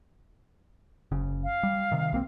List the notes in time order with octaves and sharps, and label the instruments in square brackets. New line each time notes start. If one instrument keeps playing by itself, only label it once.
[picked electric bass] F#1 C#3
[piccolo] F5
[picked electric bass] G3
C3 D#3
B1 A#3 C4